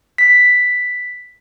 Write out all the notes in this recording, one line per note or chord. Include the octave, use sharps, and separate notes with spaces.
B6